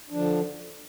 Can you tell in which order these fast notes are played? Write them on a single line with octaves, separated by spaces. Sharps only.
D4 F3 D3